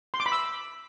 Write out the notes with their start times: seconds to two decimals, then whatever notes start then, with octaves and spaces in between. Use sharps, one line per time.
0.14 C6
0.20 D6
0.26 B5
0.32 E6